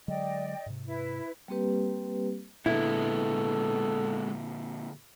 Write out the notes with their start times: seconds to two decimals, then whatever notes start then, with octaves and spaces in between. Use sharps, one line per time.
0.08 D3 F#3 G#3 D5 D#5 G5
0.66 G#2 C3
0.87 E4 B4
1.48 G3 A#3 C4 G4 B4
2.66 A#2 D3 G#3 B3 E4 A4